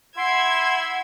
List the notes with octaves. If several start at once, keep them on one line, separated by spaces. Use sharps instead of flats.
E4 F#5 C6 E6 G#6